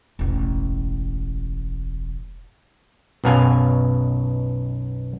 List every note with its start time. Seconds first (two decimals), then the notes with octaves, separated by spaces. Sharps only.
0.19 E1 A1
3.24 B1 F#2 B2 F5 G#5